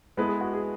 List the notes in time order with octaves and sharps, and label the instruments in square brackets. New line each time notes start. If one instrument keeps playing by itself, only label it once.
[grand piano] G#3 B3 E4 B4 [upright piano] A4
[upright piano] G#4
F#4
G#4